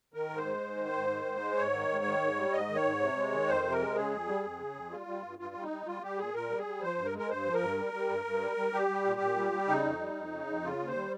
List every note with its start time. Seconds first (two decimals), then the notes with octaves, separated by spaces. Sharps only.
0.14 D#3 A#4
0.29 G#2
0.38 C5
0.46 G#3
0.61 G#2
0.77 D#3
0.93 G#2
1.10 D#3
1.25 G#2
1.41 G#3
1.57 G#2 C#5
1.73 D#3
1.88 G#2
2.05 D#3
2.21 G#2
2.36 G3
2.52 G#2 D#5
2.68 D#3
2.76 C#5
2.84 G#2
3.00 C3
3.16 G#3
3.32 D#3
3.48 F2 C5
3.63 C3
3.72 A#4
3.79 G#3
3.95 C#3 G#4
4.11 F2
4.27 G3
4.43 F2
4.59 C#3
4.75 F2
4.91 G3 F4
5.07 G3
5.23 G2
5.39 G2 F4
5.55 G3
5.62 D#4
5.71 G3
5.86 G3 F4
6.02 G3 G4
6.18 A#2 G#4
6.34 A#2 A#4
6.50 G3
6.58 G#4
6.66 G3
6.82 F3 C5
6.98 G2
7.05 A#4
7.13 G#3
7.18 A#4
7.29 G2 C5
7.46 F3
7.53 A#4
7.61 G2
7.77 G3
7.93 G3
8.09 G2
8.25 G2
8.40 G3
8.57 G3
8.73 G3 G4
8.88 G3
9.05 A#2
9.20 A#2
9.36 G3
9.52 G3
9.68 C#3 D#4
9.84 F2
9.99 G3
10.16 F2
10.32 C#3
10.47 F2
10.63 C#3 F4
10.79 D#2
10.88 C5
10.95 G3